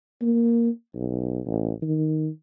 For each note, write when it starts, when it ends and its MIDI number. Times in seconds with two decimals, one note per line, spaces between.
0.22 0.70 58
0.95 1.40 35
1.46 1.73 33
1.82 2.28 51